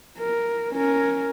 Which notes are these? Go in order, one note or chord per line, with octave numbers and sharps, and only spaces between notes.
A#4
C#4 A#4